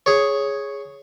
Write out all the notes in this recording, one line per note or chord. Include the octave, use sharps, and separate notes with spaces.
G#4 C#5